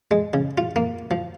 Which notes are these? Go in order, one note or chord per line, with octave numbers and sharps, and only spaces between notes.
G#3
C#3
F4
A#3
F3